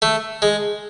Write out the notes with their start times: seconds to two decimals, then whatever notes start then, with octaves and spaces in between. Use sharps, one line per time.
0.02 A3
0.42 G#3